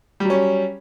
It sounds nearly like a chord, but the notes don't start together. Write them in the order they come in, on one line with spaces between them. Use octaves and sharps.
G3 F#3 C#4